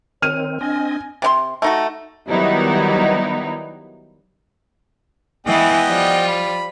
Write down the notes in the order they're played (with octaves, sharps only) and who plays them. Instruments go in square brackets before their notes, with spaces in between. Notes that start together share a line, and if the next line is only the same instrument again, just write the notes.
[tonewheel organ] D#3 C4 [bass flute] C#5 [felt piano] F6 D#7
[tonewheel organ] C4 D#5 [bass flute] D4 [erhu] G#5
[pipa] C3 D4 C6
A3 D#4 F#4
[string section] D#3 F#3 G3 B3 D#4 E4
[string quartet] E3 G#3 [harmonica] B3 D#5 G5
[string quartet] F3 G3 F4
[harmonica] B5